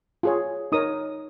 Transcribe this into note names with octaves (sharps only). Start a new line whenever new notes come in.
F4 G#4 C#5
D#4 A#4 C#5 D#6